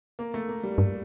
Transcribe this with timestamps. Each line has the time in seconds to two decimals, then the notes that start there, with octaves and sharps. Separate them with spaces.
0.19 A#3
0.34 A3
0.49 A#3
0.63 G3
0.78 G2